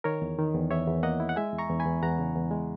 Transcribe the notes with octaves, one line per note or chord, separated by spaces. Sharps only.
D#3 A#4 C#5
E2
D#3
E2
E2 C#5 E5
E2
A#3 D#5 F#5
E4
F#5
G#3 E5 G#5
E2
A#5 C#6
E2
G#5 B5
E2
E2 F#5 A#5
C#3
E2
G#3